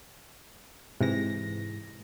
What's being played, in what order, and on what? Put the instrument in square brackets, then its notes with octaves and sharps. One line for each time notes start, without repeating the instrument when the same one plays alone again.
[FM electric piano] G#2 E3 A#6 [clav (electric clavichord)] C3